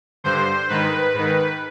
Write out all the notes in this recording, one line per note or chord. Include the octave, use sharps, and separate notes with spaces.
G2 D3 C5
G#2 D#3 B4
G#2 D#3